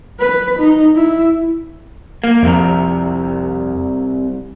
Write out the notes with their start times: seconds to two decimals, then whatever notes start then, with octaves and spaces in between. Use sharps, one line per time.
0.20 B4
0.59 D#4
0.95 E4
2.24 A#3
2.43 C2 F2 C3 A#4